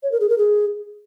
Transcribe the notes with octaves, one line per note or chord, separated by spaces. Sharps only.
C#5
A#4
G#4
A#4
G#4